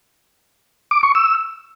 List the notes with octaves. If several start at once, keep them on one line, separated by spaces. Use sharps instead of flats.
D6
C#6
E6